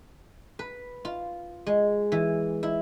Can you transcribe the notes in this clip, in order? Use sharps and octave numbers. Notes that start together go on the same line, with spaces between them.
B4
F4
G#3
E3
E4